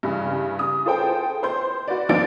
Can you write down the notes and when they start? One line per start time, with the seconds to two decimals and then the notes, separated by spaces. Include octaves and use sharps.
0.03 G2 C#3 E3
0.59 D#6
0.86 F4 G#4 A4 C5 G5
1.43 C5 C6 G6
1.88 F#4 B4 D5
2.09 G1 F3 D4 D5 A6 D7